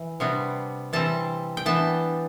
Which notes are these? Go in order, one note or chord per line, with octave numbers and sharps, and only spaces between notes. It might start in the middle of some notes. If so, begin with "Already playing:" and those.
Already playing: E3
C3 G3 B3 D4
E3 G3 C4 A5
G5
E3 B3 D4 A5